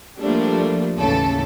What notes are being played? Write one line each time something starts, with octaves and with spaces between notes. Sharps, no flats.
F3 G3 A3 A#3 D4
A1 D#2 C#3 E3 A4